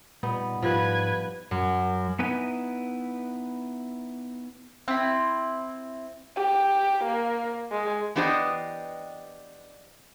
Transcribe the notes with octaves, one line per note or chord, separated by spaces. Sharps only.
A#2 G3 B3 D#4
G#2 F3 G3 B4 G#6
F#2
B3 D#4 E4 B4 G#5
C4 E4
G4
A#3
G#3
E3 B3 D4 G4 C5 D#5